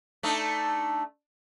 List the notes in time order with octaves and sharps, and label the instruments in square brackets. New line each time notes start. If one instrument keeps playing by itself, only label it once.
[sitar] A3 D4 D#4